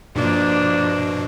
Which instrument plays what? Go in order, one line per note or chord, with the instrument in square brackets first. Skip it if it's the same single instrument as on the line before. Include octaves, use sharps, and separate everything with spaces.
[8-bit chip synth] G2 B2 [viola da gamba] F3 A#3 D4